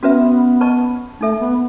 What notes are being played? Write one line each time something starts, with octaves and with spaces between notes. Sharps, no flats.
B3 C#4 F#4 B4 E5
B4 D#5 A5 C#6
A3 D#4 A4 E5
B3